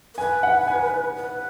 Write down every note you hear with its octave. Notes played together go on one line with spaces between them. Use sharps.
A#4
B4 G#5
F#5
G#5
B4